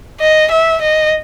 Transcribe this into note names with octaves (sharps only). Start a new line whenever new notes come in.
D#5
E5
D#5